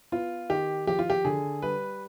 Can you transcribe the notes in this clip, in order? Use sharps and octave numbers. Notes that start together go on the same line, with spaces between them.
B3 F4
D#3 G4
F3 G4
F4
G4
D3 G#4
G3 B4